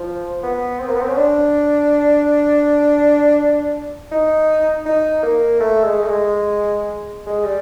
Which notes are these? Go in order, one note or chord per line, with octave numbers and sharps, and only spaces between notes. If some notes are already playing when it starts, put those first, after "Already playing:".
Already playing: F3
B3
C4
A#3
B3
C4
C#4
D4
D#4
D#4
A#3
A3
G#3
A3
G#3
G#3
G3